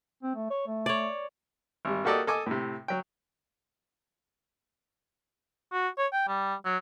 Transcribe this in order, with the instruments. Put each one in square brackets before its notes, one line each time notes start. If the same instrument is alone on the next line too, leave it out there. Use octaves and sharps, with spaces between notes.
[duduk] C4
A3
C#5
A3
[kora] C#5 D5
[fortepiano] G#1 G3
A#3 F#4 G4 A4 D5 D#5
A4 D#5 G#5 D6
A2 C3
F#3 G5
[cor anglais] F#4
C#5
G5
G3
F#3